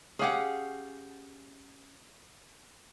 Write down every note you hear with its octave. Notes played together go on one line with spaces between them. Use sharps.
C#4 G4 G#4 F5 F#5